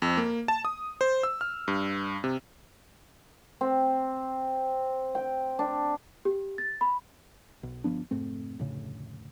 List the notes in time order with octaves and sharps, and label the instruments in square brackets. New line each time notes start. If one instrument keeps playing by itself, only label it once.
[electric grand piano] F2
A#3
A5
D#6
C5
E6
F6
G2
C3
[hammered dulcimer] C4
G5
D4
[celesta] G4
A6
B5
[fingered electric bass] B1
G1 F3 B3 D4
F1 G#2 A3 C4
F1 D2 A2 C#3